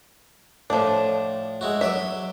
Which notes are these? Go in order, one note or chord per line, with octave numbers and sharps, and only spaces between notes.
A2 F3 D4
G#3 E4 F#4
F#3 C#5 D5 E5